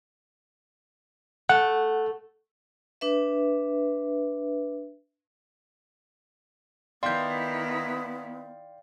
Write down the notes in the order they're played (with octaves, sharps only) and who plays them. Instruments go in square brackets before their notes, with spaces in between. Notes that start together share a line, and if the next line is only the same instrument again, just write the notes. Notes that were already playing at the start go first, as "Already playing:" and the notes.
[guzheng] A3 [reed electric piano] F#5
[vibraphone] D4 B4 E5
[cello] D#3 E4 [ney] B3 [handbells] D5 F5 G5 [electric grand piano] C6 G6